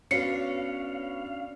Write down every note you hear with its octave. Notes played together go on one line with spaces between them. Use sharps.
B3 C#4 D4 F#4 C#5 F5 C#7